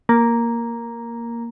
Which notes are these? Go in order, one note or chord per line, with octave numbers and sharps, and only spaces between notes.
A#3